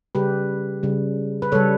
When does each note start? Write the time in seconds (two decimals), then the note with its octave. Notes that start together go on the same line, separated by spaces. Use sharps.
0.15 C#3 G3 G4 B4
0.83 C#3 G3
1.42 B4
1.52 C#3 G3 A4 C#5